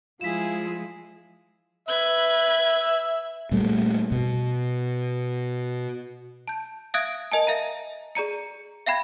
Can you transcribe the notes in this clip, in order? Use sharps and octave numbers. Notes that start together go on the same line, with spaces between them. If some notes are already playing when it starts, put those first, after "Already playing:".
F3 G#3 E4 F4 G#4 B6 E7
B4 E5 G#6
A#2 G3 A3
B2
A5 G6
E5 F5 D#6 F#6 G#6 D7
A#4 D#5 G#5 A5
A#4 E5 F5 G#5 A#5
G#4 D5 A#5 C#7
E5 F5 G5 B5 G#6